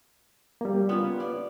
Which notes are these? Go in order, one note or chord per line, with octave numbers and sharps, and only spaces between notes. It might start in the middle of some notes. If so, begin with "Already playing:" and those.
G3 A#3
B3 C#4 F4
D5